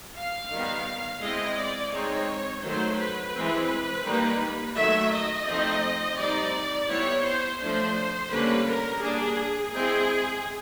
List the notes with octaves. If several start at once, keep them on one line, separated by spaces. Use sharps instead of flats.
F5
D#3 G3 B3
G#3 C4 E4 D#5
D5
G#3 C4 D#4 C#5
D#3 F#3 A3 C5
B4
E3 G#3 C4
D#3 G3 A#3
D#3 F#3 A3 E5
D#5
F3 A3 C4 D#4
G3 C4 D#4 D5
G3 B3 E4 C#5
C5
F3 A3 D4 C5
D3 G3 A#3 C#4 B4
A#4
G3 A#3 D4 G#4
G#3 C4 E4 G#4